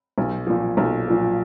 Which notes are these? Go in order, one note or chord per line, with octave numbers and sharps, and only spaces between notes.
B1
A#2 F3
B1
A#2 F3